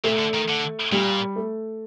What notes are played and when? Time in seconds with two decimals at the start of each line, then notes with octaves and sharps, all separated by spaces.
0.04 A#2 A3
0.19 D3
0.34 D#3
0.48 D3
0.92 A#2 G3
1.36 A3